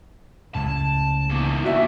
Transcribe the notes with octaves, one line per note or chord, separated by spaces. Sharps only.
C#2 A2 A5
E2 A#3
F#4 E5